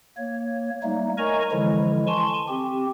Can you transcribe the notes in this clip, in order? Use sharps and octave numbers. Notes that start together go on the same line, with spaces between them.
A#3 C#5
G3 A3 A#3 D#4
A#4 C#5 D#5 G#5 A#5 C#6
D3 E3 F3 G#3 E4
G#5 A5 C6 C#6
C4 G4